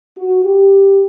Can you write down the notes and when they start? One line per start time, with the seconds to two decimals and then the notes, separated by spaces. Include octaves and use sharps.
0.17 F#4
0.44 G4